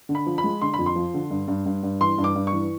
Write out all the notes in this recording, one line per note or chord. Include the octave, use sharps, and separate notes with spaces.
D3
B5
F3
B5
G#3
D3 C6
B5
F2
C6
F3
D3
G2
G2
G2
G2
E3 C6
G2
D6
G2
C#6
E3